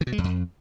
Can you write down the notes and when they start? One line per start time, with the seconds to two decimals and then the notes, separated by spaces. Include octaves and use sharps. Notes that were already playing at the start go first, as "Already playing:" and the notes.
0.01 D#3
0.07 B2
0.12 G#3
0.18 E2
0.24 F2